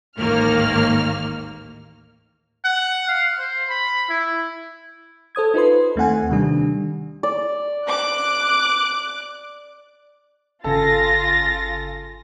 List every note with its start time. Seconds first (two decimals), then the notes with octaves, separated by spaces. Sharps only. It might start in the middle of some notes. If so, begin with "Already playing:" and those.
0.19 A1 D#2 G#2 D#3 A#3 F6
2.64 F#5
3.08 F5
3.39 C5
3.70 B5
4.10 E4
5.35 A4 C5 D#6 G#6
5.54 D#4 F4 B4 C6
5.96 D#2 A3 C4 F#5 G#5
6.29 C3 D#3 G3 D4
7.23 D5
7.86 D6 F#6
10.64 G1 C#3 F4 A4 G#5 A6 A#6